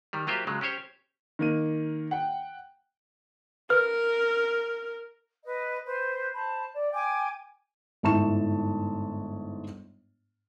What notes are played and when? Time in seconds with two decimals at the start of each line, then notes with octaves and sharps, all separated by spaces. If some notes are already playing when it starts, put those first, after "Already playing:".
0.13 D#3 G3
0.27 F#3 A#3 F4 G4 C5 E5
0.47 C#3 F#3 G#3
0.61 C#4 G4 C5 C#5
1.39 D#3 A#3 D#7
2.11 F#5 G5
3.70 A#4 B4 F6
5.43 B4 D#5
5.85 B4 C5
6.33 C5 A5 B5
6.73 D5
6.92 G5 G#5 D6
8.03 G1 G#2 E4 A5 C#6 E7